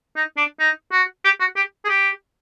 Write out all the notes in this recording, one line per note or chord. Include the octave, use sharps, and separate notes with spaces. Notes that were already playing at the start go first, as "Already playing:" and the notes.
D#4
D4
D#4
F#4
G4
F#4
G4
G#4
G4